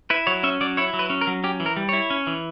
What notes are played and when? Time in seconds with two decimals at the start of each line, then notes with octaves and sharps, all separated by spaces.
0.10 E4 B4
0.27 F#3 C#5
0.43 C#4 E5
0.61 F#3 D5
0.77 E4 C#5
0.93 F#3
0.99 B4
1.10 C#4
1.21 A#4
1.27 F#3
1.44 C#4 G4
1.60 E3
1.66 A#4
1.76 G3
1.89 E4 C#5
2.10 C#4
2.27 E3